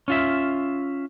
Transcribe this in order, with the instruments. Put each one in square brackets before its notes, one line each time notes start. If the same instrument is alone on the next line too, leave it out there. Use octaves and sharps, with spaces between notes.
[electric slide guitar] C#4 F4 E5